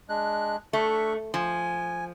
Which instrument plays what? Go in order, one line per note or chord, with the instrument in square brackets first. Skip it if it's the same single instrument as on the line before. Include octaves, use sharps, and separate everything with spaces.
[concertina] G#3 D4 F#6
[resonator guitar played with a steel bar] A3 [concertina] D4 E5 C#6
[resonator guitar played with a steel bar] F3 [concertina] G#5